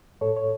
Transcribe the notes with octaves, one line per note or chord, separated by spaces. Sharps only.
A2 A4 C#5
C#5